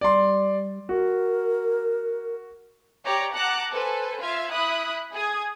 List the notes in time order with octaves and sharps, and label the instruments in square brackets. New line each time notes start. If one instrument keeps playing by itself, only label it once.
[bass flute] G3 [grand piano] D5 C6
[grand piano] F#4 [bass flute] A#4
[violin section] G4 C#5 D5 A#5 D6
F#5 A5 A#5 D6 F#6
A4 B4 C5 G#5
F4 E5 F5 G#6
E4 B5 D#6 F#6
G#4 D#6 G#6